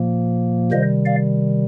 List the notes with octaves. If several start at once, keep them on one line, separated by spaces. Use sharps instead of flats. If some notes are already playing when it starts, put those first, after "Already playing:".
Already playing: A#2 F3 A#3
C3 D#3 G3 C5 D#5
D5 F5